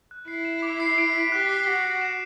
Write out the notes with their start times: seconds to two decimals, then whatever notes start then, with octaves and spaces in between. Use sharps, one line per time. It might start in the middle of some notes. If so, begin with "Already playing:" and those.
0.11 F#6
0.28 E4 C7
0.45 E7
0.62 D6
0.80 C7
0.98 D7
1.14 B6
1.32 G4 F#6
1.49 C7
1.66 F#4 F#6
1.84 C7
2.01 E7